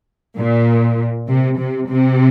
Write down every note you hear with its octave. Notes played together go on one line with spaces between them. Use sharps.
A#2
C3
C3
C3